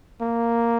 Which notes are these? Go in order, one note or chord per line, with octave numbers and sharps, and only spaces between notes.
A#3